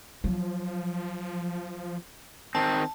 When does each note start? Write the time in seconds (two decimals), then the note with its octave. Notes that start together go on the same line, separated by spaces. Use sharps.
0.24 F3 F#3
2.55 D#3 C4 A5